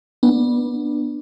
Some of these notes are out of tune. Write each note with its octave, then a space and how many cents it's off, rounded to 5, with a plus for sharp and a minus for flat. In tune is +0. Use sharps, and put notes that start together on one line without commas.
B3 -20 D4 +15